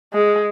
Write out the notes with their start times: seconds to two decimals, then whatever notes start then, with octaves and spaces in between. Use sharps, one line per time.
0.14 G#3